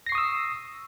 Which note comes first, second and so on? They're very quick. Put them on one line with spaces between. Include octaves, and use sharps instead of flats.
A#6 C7 C#6 D#6 E6